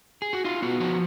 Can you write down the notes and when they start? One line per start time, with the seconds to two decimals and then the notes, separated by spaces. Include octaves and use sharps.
0.22 G#4
0.33 F#4
0.44 D#4 F4
0.62 B3 F#4
0.80 F3 F#4